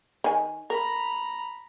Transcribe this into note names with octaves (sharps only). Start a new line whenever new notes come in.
D#3 G#5
A#4 A#5 B5